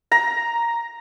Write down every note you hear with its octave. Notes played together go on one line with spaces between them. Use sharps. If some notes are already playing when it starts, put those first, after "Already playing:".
A#5